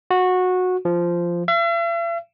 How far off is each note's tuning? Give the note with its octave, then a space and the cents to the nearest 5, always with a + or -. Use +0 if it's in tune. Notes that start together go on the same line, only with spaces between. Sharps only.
F#4 -15
F3 -10
E5 +45